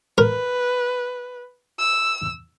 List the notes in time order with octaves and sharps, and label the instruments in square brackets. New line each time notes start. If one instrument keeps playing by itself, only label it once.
[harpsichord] A#4 [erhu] B4
[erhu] E6